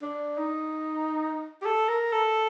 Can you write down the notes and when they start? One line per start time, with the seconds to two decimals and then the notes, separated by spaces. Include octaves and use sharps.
0.02 D4
0.38 D#4
1.62 G4
1.65 A4
1.88 A#4
2.12 A4